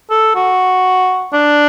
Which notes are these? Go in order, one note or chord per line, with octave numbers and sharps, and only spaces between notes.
A4
F#4
D4